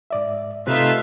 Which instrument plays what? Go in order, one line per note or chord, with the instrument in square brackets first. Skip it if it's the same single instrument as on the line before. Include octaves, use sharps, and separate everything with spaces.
[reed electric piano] G#2 D5 E5
[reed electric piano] C3 C4 [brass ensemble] A3 D#4 F4 [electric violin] B4 E5